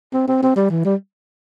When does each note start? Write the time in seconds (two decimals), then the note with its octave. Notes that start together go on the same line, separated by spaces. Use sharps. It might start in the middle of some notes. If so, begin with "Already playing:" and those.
0.13 C4
0.28 C4
0.42 C4
0.56 G3
0.70 E3
0.85 G3